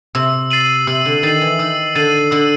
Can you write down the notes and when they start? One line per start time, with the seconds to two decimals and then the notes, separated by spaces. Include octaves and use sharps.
0.15 C3 E6
0.51 A6 C7 D#7 F#7
0.87 C3 E6
1.05 D3
1.23 D#3 A6 C7 D#7 F#7
1.41 E3
1.59 D#3 E6
1.95 D3 A6 C7 D#7 F#7
2.31 D3 E6